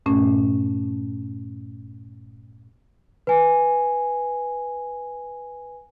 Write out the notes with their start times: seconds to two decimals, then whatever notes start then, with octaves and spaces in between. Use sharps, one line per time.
0.06 G2 A#2 A3 C#4
3.27 B4 G#5